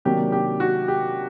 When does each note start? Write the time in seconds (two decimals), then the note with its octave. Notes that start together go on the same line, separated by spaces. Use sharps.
0.05 C3 D#3 F#3 A#3 D4 G4
0.32 G4
0.60 F#4
0.88 G4